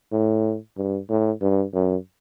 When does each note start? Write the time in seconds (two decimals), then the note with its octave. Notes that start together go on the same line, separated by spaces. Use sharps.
0.12 A2
0.77 G2
1.09 A2
1.41 G2
1.74 F#2